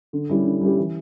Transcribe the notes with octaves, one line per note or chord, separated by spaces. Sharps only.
D3
G3 C#4 E4 G4
D3
G3 C#4 E4 G4
E3